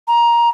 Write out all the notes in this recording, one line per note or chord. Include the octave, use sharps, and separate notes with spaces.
A#5